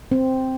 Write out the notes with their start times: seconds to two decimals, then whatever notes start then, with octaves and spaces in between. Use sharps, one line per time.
0.12 C4